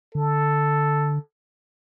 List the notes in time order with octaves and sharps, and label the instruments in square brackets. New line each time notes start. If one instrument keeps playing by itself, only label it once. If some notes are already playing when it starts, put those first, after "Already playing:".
[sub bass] D3 [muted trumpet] A4